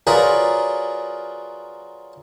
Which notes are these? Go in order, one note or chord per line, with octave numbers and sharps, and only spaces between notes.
F#3 F4 G#4 A#4 B4 D5